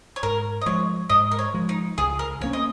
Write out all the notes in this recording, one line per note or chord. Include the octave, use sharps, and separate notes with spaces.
C#5
G#2 A#4
D#5
F3 G#3 C#5
G#2 D#5
A#4
C#5
F3 G#3
D#4
C#2 G#4
A#4
C#3 A#3 C#4 C#5
D#5